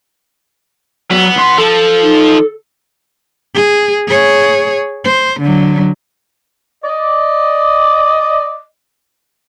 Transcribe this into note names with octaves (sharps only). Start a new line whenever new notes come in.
F#3 B3
B1 C6
F3 A4
D#4
G#4
G#4 C#5
C5
D3 F#3
D5 D#5